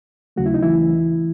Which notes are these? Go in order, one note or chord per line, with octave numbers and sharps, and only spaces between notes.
D#2 C#3 F#3 A3 F#4
E4
D#4
E3 E4